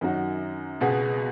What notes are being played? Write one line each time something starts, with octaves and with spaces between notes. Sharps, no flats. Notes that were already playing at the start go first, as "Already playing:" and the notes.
F#2 D#3 F#3 D#4 F#4
C#2 B2 B3 G#4